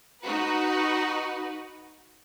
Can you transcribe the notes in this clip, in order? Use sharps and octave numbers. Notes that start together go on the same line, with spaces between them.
D#4 F#4 B4